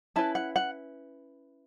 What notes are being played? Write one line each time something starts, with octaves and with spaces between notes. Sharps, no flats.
C#4 E4 B4 A5
F#5
F#5